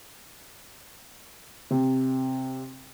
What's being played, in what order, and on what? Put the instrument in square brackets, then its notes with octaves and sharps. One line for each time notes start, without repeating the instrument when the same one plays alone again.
[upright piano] C3